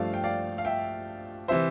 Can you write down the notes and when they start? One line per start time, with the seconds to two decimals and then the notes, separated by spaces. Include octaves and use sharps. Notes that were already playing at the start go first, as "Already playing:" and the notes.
Already playing: G2 F3 A3 D5 F5
0.14 G5
0.24 D5 F5
0.58 F5
0.65 E5 G5
1.48 C3 E3 C5 E5